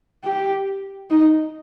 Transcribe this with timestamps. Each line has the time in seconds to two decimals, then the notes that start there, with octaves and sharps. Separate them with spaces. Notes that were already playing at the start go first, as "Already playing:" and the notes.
0.24 G4
1.10 D#4